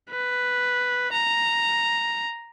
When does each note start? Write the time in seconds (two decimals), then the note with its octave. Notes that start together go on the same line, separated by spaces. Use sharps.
0.10 B4
1.13 A#5